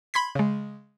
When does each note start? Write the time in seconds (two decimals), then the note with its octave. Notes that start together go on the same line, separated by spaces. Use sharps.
0.14 B5 C6 G#6 B6
0.35 C#3 G#3